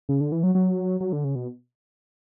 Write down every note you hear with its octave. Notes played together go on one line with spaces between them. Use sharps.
C#3
D3
E3
F#3
F#3
F#3
D3
C#3
B2